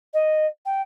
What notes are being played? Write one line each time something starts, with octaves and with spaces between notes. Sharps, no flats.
D#5
G5